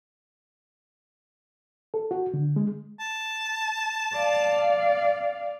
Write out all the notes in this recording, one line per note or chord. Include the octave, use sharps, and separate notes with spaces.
A4
F#4
D3
G#3
A5
D5 F5